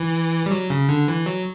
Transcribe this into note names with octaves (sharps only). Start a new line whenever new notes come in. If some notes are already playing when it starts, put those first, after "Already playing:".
Already playing: E3
G3
F#3
C#3
D3
E3
F#3